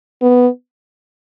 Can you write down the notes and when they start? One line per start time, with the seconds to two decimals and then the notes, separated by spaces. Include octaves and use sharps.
0.22 B3